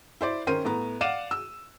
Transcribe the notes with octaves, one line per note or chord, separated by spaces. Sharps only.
E4 C5 D5
D#3 C#4 A#4 C5 D#7
A2 B3 A#5
D5 F5 F#5 D#7 E7
E6